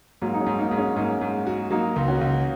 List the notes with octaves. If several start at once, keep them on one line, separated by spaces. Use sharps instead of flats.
G#2 F#3 A#3
D#4
G#3 C#4
G#2
A#3 D#4
G#2
G#3 C#4
G#2 A#3 D#4
G#2
F#4
F#3 A#3 D#4
C#2
C#4 F#4
C#2